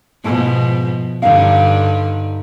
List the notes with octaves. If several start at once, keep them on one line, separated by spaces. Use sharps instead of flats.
G#2 B2 F3 E4 A5
G2 D3 D#4 E5 F5